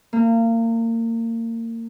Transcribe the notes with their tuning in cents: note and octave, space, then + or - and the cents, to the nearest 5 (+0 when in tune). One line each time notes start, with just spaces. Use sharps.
A#3 -30